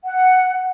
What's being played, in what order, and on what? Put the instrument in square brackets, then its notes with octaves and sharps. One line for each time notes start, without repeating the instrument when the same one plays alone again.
[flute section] F#5